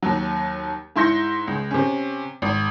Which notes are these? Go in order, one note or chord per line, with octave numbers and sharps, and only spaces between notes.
D#2 F#3
G#2 E4 C6 G6 A#6 C#7
C#2
C3 C#4
G#1